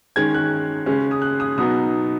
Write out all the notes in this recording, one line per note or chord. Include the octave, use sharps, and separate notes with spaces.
D#3 G#3 C#4 G#6
F#6
C#3 G#3 C#4
D#6
F#6
D#6
B2 F#3 B3 D#4 D#6